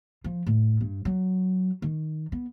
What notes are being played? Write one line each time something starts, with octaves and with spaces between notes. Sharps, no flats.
F3
A2
G2
F#3
D#3
B3